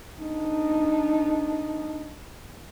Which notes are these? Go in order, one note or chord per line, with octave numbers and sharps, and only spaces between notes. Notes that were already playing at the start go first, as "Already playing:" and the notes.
D4 D#4